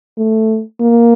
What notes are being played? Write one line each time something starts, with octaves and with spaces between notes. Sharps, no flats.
A3
A#3